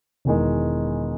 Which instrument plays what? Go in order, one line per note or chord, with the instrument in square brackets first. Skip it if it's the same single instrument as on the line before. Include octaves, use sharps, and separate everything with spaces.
[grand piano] E1 E2 D#3 G#3